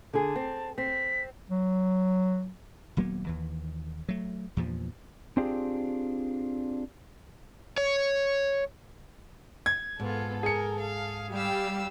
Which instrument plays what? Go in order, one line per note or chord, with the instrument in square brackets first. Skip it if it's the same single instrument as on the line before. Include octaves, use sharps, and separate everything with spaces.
[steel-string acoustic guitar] D3 G#4 [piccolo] A5
[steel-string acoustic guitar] C4
[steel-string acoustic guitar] C4 [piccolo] B6
[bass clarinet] F#3
[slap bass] D#1 F#3 A#3 B3
D#2 E3
F#3 A3
E2 G2 A#2 F3
[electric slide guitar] C4 D4 F4 G4 G#4
C#5
[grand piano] G#6
[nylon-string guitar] G#2 [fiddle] B3 F4 [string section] A4
[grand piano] G#4 C#7 [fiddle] A#4
[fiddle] F5
[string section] G3 G4 [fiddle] F5 E6